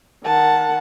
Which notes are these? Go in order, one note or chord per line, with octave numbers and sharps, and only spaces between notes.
D#3 F#5 A5